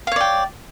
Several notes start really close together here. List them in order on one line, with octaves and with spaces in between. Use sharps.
F5 C#5 D5 G5